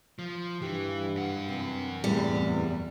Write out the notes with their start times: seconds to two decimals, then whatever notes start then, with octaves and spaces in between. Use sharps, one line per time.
0.19 F3
0.62 G2 E3 G4
1.16 F#2 F#5
1.49 C3 E3
2.04 E2 A2 C3 G3